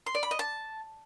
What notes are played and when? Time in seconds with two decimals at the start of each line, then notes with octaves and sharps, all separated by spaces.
0.06 C6
0.15 D5
0.23 B5
0.31 D#5
0.39 A5